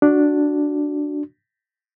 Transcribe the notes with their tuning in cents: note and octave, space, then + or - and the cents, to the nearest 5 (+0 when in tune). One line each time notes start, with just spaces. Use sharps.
D4 +0 F#4 +0